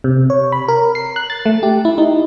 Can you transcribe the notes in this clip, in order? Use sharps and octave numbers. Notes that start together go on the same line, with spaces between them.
C3
C#5
B5
A#4
C7
F#6
A6
A3
G4
E4
D#4